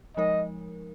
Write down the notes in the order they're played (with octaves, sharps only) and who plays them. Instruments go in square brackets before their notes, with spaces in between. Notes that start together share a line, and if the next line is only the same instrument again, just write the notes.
[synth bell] F3 G#3 D#4 A#4 [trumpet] D#5